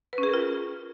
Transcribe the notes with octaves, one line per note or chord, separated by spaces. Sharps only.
B4
C#4
G#4
A#4
F4